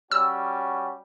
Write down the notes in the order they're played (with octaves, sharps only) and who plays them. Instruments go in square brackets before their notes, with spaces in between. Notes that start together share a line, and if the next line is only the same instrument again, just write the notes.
[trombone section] G3 C#4 F#4 [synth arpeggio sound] E6